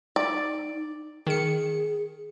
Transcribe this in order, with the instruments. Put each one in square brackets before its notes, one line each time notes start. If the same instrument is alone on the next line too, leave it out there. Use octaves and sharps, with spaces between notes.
[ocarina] D#4 [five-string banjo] D5
[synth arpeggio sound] D#3 C#7 [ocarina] G#4